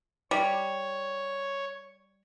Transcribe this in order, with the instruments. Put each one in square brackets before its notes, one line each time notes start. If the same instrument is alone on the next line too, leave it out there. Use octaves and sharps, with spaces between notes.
[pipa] G3 [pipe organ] C#5